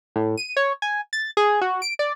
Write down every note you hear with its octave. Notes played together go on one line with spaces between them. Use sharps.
A2
D#7
C#5
G#5
A6
G#4
F#4
D7
D5